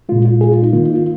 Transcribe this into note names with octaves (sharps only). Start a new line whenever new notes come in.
A#2 G#3 F4
F4
G#4
F4
D#4
D#3 A#3 F4
D#4
F4